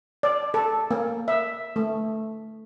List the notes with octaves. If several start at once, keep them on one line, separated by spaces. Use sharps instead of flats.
D5
A4
A#3
E5
A3